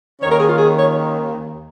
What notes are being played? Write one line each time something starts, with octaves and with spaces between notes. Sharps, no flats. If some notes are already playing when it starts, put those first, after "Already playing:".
D#2 D#3 C#4 C#5
A#4
G#4
F4
G#4
C#5